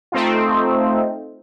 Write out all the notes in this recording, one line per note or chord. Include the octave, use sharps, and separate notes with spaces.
A3 C4 D#4 F4